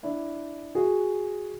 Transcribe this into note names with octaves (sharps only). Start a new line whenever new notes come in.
D4 E4
F#4 G#4